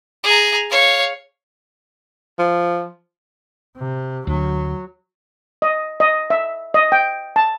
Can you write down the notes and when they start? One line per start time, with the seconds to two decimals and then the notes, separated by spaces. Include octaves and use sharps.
0.24 G#4 A#5
0.70 C#5 F5
2.39 F3
3.77 C3
4.27 D2 F#3
5.62 D#5
6.00 D#5
6.30 E5
6.74 D#5
6.92 G5
7.36 A5